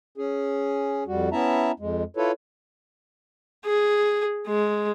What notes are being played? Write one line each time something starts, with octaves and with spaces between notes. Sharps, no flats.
C#4 G#4
F2 G3 F#4
B3 C#4 E4 E5 A5 A#5
F2 G#3
E4 F4 A4 B4 C#5
G#4
G#3